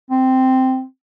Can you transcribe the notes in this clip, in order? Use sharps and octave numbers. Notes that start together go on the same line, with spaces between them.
C4